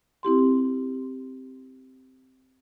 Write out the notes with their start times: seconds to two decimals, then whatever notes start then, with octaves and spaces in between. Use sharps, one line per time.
0.23 C4 E4 G4 C6